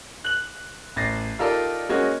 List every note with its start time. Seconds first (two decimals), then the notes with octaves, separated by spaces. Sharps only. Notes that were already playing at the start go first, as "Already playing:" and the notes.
0.25 F#6 F#7
0.96 A1 A6 A#6 C7
1.39 D#4 F4 G4 A4 A#4 D5
1.89 G#3 A#3 C#4 F#4 C#5 D#5